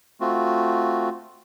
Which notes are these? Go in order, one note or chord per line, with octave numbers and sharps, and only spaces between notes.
A3 C4 F4 F#4